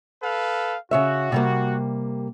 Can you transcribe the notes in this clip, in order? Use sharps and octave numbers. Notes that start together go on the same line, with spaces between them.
A4 B4 F5
C#3 F#4 C#5 E5
C3 G3 A#3